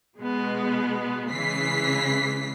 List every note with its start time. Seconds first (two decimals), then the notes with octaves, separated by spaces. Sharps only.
0.19 B2 G#3 B3
1.30 C#3 E3 G#3 B6 C7